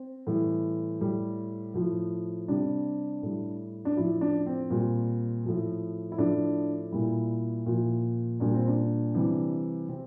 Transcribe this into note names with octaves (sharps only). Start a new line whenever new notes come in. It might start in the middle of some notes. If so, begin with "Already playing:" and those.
Already playing: C4
A2 E3 G3
A2 G3
A2 F3
C3 G3 D4
A2 G3
D4
A2 F3 E4
D4
C4
A#2 G3
A2 F3
E4
A2 F3 D4
A#2 G3 E4
A#2 F3
A#2 G3 D4
C4
D4
C3 E3 G3
C3 C4